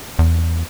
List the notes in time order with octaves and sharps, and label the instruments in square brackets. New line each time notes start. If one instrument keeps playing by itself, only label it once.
[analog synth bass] E2